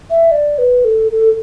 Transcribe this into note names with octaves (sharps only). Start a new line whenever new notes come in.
E5
D5
B4
A4
A4